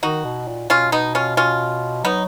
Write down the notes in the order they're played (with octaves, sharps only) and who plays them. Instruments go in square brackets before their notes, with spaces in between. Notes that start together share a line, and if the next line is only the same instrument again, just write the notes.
[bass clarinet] D#3 [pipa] D#4 F#4
[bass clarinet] B2
A#2
[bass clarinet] B2 [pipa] C#4 F4
[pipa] B3 D#4
C#4 F4
C#4 F4
[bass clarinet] F#3 [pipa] B3 D#4